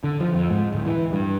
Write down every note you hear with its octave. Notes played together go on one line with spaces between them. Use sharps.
D3
F3
F2
G#2
D1
E3
G2